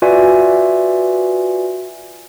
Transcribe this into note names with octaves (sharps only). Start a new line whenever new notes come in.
F4 F#4 B4 D5 E5 G#5